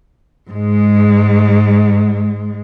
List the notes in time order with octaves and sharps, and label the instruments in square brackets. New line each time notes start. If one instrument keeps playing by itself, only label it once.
[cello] G#2 G#3